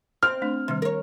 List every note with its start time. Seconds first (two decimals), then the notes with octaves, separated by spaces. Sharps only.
0.23 C4 F6
0.42 A3 D4
0.68 C3 D#3 G3
0.82 A#4 C#5